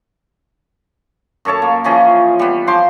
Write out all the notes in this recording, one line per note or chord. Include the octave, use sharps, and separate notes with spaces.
F#2 A4 C#5 A5
A#3
E3 F3 C#4 G#4
G3 B3
F3 C5 C6 D6